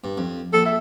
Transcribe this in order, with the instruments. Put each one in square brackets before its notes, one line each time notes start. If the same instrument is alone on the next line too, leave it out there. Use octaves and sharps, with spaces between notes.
[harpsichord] G2
F2
[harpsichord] A#1 [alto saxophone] A4
[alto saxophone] E5